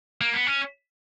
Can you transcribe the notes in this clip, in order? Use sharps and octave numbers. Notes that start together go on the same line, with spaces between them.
A#3
B3
C#4